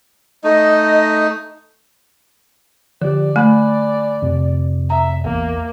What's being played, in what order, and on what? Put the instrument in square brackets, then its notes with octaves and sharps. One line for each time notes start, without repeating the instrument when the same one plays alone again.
[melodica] A3 D#4 [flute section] D#5
[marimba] D3 [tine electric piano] F3 G4 [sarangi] D5
[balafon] A3 [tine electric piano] G#5 B5 F#6
[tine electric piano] F2 C3
[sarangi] E5 [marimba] A#5
[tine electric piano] A1 E2 [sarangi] A#3